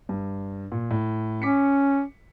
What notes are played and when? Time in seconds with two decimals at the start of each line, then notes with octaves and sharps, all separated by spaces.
0.09 G2
0.72 A#2
0.91 A2
1.42 C#4 D6 B6 C#7